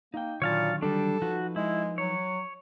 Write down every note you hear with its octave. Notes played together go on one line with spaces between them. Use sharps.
A#3 D#4 G5
A#2 D3 D#3 F#3 C#5 F5 A5
G3 D4 A4
F3 D#4 F#4 B4
G#3 E4
F#3 C#5